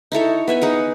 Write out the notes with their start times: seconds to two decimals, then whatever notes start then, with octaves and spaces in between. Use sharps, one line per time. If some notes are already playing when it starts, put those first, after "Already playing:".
0.12 D#4 E4 A4 C#5
0.48 B3 E5 G#5 B5
0.62 D#4 G#4 F#5